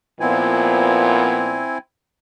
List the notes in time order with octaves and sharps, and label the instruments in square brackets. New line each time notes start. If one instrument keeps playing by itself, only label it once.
[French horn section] A#2 F3 B3 [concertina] C4 E4 G#5